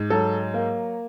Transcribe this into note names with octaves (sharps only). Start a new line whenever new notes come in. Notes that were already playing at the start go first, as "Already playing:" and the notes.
Already playing: G#2
F#3 A4
A#3